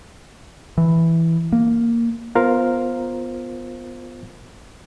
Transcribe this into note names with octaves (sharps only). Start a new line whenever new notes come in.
E3
A#3
B3 F4 A#4 C5 F5